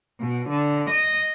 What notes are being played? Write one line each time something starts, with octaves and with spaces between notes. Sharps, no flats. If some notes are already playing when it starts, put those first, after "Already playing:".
B2
D3
D#5